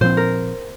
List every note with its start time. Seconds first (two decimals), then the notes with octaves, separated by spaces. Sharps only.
0.01 A#2 F3 C4 C5
0.17 A#4